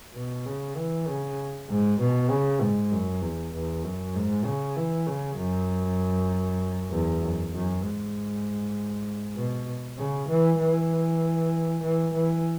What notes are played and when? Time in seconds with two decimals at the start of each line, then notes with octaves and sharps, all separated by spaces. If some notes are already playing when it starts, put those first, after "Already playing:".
0.15 B2
0.45 C#3
0.76 E3
1.08 C#3
1.69 G#2
2.00 B2
2.30 C#3
2.61 G#2
2.91 F#2
3.22 E2
3.54 E2
3.84 F#2
4.14 G#2
4.45 C#3
4.76 E3
5.07 C#3
5.37 F#2
6.91 E2
7.21 F#2
7.52 F#2
7.82 G#2
9.36 B2
9.98 C#3
10.28 E3
10.59 E3
11.83 E3
12.14 E3